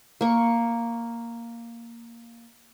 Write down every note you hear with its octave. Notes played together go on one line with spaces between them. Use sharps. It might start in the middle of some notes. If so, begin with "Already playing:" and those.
A#3 C#6